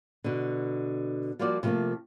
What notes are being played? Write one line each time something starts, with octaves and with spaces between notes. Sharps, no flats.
B2 D3
F3 G3 A#3 F4 F#4 D5
C3 F3 G3 A3 A#3 C4